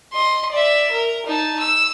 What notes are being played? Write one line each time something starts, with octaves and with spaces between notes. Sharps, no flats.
D#5 C6
D5 E5
A#4
D#4 A5
E6